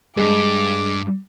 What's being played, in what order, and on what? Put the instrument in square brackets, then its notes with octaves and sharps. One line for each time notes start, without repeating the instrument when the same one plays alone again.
[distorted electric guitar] G2 [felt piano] G#3 [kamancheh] D6